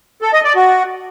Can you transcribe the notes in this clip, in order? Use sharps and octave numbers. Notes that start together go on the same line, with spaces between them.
A4
D#5
D5
F#4